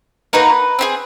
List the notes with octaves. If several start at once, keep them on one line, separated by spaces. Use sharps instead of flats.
A#3 D#4 F#4 B4
C4 F4 G#4